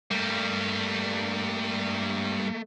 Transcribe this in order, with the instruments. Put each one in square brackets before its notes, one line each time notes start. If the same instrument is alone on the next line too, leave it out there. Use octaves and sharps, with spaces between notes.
[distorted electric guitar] G2 G3 [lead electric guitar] A3 A#3